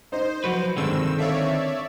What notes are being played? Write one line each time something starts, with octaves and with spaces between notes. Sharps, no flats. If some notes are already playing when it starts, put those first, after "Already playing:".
D#4 C5 D#5
F3 F#3 F#4 B4
C2 G2 D3 D#3 G#3 C4 E6
A4 C#5 D5 E5 F5